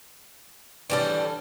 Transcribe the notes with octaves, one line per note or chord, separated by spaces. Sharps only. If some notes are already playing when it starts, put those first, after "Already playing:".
A2 D3 E3 G3 C#4 A4